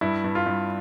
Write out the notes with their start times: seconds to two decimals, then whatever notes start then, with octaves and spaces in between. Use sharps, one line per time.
0.01 G2 E4
0.24 G2
0.35 F4
0.46 G2